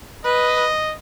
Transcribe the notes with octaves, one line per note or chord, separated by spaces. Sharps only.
B4 D#5